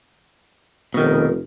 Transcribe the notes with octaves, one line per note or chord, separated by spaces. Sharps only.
F1 B2 D#3